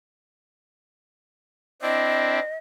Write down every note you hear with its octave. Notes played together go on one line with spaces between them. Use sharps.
C4 D4 E4 D#5